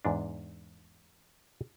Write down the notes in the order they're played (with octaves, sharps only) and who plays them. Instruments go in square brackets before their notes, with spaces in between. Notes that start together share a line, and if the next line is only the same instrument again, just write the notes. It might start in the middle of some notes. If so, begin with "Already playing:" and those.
[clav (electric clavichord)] E2 G#2 D4